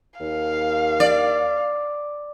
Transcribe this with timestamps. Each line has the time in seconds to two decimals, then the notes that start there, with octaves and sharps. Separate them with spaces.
0.20 D#2 F5
1.00 D5